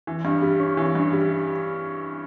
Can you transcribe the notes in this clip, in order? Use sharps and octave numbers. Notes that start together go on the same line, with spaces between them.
E3
G2
G3
C#4
E3
G2
G3